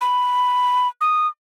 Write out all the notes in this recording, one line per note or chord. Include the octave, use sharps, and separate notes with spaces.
B5
D#6